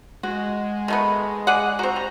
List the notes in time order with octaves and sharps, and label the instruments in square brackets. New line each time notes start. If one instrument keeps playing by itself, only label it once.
[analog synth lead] G#3 [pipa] F#4
[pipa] D#3 A3 B3
G#4 D5 F#5
[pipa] C4 F#4 [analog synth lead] A#5
[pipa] G3